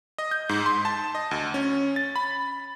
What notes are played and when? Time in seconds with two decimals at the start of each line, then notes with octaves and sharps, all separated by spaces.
0.18 D#5
0.31 G6
0.49 G#2
0.66 C6
0.85 A5
1.15 D#5
1.31 D2
1.54 C#4
1.96 A6
2.16 B5